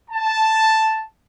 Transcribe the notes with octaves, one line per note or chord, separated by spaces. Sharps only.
A5